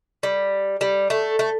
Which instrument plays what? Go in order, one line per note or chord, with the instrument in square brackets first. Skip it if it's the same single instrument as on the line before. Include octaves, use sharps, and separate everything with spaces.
[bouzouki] G3
G3
A3
A3